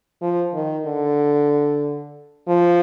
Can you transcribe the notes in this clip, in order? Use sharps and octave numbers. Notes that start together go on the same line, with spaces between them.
F3
D#3
D3
F3